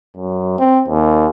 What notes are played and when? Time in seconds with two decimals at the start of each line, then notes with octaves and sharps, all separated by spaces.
0.17 F#2
0.59 C4
0.88 D#2